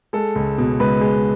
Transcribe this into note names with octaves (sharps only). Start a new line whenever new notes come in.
G#3 A4
C#2
B2
C#2 B4
G#3